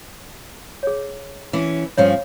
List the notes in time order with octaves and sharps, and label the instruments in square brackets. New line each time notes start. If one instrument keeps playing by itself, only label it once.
[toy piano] G#4 C#5
[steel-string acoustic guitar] E3 C#4
[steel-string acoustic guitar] G2 F3 C#4 [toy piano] C#5